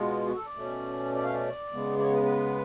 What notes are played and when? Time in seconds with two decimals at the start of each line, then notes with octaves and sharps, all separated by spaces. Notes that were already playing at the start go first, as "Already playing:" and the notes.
Already playing: B2 G#3 B3 F4
0.26 F#4
0.36 A4
0.46 D5
0.55 B2 A3 C#4
1.14 D5
1.24 F5
1.34 D5
1.73 C#3 G#3 B3
1.99 D5
2.02 C#5
2.13 B4
2.23 B4